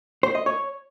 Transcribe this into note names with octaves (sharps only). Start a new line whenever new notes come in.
C5
D#5
C#5